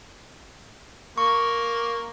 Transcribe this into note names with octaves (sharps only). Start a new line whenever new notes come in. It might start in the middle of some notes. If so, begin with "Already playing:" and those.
A#3 C#6